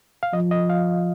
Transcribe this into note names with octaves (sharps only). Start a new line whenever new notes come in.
F5
F3 D#5
D#5
F5